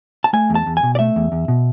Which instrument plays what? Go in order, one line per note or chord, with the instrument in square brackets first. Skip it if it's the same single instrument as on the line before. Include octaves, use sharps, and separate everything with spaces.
[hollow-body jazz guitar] A5
A3 G#5
E2
A5
E2
G#5
B2
D5
A3 E5
E2
E2
B2